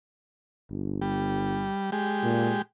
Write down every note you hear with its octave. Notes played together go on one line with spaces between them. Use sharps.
G1
G3
G#3 G4
A#2